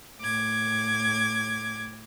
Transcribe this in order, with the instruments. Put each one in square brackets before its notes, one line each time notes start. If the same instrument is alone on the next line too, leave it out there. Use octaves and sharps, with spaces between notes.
[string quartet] A2 D6 G#6